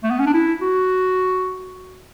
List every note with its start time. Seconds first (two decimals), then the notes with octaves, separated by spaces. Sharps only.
0.04 A3
0.11 B3
0.20 C#4
0.27 D4
0.34 E4
0.62 F#4